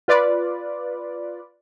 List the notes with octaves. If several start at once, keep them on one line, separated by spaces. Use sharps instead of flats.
F4 B4 D5